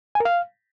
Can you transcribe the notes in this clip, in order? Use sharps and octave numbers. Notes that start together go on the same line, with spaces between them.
G#5
A#4
F5